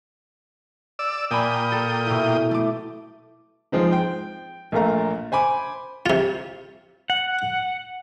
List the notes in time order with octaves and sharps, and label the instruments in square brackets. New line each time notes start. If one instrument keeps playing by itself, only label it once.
[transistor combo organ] D5 E6
[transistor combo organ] A#2 G5 D#6 [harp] D5 G#5 B5
[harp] A4
B2 E4
A3 D6
[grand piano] F3 G#3 C4 D#4
G5
A#1 A#2 A3 A#4 F5 A#5
C5 G#5 B5 D6
[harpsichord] C3 F4
[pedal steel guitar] F#5